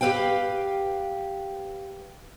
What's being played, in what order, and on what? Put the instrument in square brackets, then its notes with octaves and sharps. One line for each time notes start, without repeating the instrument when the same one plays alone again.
[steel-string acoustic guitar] G4 A4 B4 F5 G5